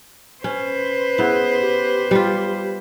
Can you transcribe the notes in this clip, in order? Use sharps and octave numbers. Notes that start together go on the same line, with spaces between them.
C#4 B4 C5
B3 E4 G#4
G4
G3 F4